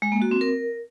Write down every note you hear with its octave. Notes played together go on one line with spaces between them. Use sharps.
G#3
A#3
F#4
C4
A#4